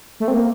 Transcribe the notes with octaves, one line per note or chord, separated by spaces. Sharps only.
A3
C4
A#3